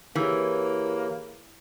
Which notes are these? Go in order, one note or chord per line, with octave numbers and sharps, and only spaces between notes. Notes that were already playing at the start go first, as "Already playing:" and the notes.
E3 A#3 G4 G#4 C#5